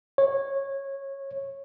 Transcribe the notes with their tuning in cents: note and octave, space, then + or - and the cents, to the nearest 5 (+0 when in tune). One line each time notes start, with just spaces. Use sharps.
C#5 -15